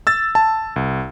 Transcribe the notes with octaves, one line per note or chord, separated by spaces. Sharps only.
E6 A6
A5
C2